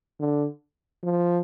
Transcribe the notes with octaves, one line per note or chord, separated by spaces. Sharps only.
D3
F3